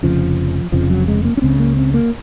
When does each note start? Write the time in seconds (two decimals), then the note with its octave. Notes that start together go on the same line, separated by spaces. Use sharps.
0.03 F1 F2 C#3 F3
0.72 F1 F2 C#3 F3
0.90 F#3
1.08 G#3
1.25 A#3
1.37 C#4
1.42 C#2 C#3 C4
1.60 A#3
1.77 C4
1.94 A#3